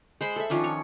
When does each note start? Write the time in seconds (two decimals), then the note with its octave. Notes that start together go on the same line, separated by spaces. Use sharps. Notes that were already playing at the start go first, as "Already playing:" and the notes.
0.21 G#3 C5 B5
0.36 A4 E5
0.50 D#3 F3 C#4 D4
0.64 C#5